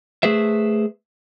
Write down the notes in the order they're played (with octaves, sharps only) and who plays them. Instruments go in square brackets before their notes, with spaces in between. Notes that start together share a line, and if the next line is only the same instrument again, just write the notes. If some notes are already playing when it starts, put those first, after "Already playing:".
[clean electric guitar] A3 G#4 B4 C5 E5